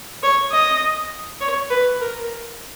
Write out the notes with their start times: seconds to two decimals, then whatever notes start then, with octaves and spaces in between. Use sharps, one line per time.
0.23 C#5
0.52 D#5
1.41 C#5
1.70 B4
2.00 A#4